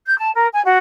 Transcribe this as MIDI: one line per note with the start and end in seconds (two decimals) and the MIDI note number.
0.04 0.16 91
0.17 0.29 81
0.34 0.46 70
0.52 0.60 80
0.65 0.76 66